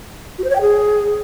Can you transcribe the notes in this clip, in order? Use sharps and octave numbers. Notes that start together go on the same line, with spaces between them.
F#4
C5
C#5
G5
G#4